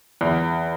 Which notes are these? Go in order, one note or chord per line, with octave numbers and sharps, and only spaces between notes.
E2